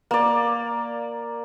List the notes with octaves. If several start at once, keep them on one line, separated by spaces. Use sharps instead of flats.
A#3 D5